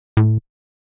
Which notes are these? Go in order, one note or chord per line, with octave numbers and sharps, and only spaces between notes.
A2